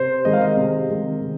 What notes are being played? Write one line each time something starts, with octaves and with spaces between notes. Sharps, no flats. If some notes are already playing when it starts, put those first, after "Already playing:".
Already playing: C3 C5
D#3 G#3 C4 D#5
F5
D#5
C3
D#3 G#3 C4
C3